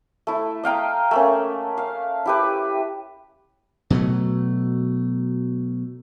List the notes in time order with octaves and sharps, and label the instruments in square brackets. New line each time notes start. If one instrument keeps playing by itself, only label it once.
[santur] A3 E4
D#5 F5 G5 A#5
A3 A#3 C#4
F5
E4 G4 B4
[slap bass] B2 F#3 A3